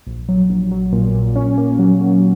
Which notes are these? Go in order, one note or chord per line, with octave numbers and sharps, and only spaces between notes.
A#1
F#3
A#1
F#3
A#2
A#2
C#4
A#3
F#3
F#3